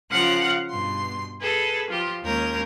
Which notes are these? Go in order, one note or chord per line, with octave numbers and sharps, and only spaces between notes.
C#3 F3 A#4 F5 F#5 F#6
G2 B2 C6
G#4 A4 B4
F3 F4 G4
D#2 G#3 C#4 A#4 G6